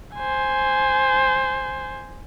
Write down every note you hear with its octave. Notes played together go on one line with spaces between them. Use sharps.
C5 G#5